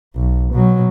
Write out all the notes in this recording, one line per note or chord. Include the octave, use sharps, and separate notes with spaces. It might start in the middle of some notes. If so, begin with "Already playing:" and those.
B1
B2 F#3